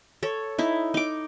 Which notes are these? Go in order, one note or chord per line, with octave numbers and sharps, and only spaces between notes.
A4 C#5
D#4 E4
D#4 D6